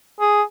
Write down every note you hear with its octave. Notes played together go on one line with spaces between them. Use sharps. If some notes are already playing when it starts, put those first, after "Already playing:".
G#4